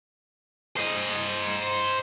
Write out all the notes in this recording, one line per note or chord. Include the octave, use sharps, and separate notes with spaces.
C5 D#5